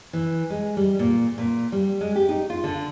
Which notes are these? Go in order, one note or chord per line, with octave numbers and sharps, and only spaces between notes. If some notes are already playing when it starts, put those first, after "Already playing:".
E3
G#3
G3
A#2
A#2
G3
G#3
G4
D#4
F4
D3